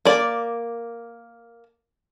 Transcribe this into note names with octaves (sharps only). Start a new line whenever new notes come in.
A#3 D5